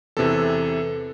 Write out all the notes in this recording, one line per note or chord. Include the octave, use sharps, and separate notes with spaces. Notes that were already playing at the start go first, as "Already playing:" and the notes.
E2 C3 E3 A4